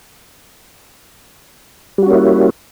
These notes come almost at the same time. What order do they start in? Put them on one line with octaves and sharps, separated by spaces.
G3 F#4 C#4 A#3 E4